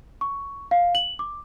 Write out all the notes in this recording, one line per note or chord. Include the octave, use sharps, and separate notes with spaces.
C#6
F5
F#7
D6